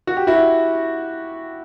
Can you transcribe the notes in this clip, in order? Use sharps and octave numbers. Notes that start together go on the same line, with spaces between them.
F#4
G4
E4 F#4